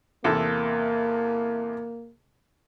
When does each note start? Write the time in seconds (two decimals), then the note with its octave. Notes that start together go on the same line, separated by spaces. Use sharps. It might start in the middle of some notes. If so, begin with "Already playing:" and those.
0.24 E2 C3 A#3 A4